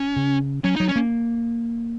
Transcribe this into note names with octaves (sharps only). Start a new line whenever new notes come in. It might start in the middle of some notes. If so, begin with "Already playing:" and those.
Already playing: C#4
C#3
F#3 C#4
D#4
F#3
C#4
A#3